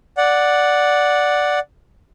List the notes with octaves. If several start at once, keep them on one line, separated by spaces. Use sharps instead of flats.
D5 F#5